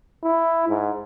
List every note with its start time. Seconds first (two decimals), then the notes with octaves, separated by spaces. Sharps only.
0.23 E4
0.69 G#2